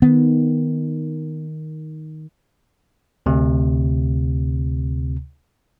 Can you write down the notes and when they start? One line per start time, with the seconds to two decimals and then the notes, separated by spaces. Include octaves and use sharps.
0.02 D#3 B3
3.26 D2 C3